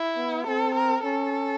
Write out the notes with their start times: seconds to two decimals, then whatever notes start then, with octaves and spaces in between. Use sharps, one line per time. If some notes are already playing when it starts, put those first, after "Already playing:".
Already playing: E4
0.17 B3
0.46 C4 A4
0.75 A#4
1.04 C#4 A4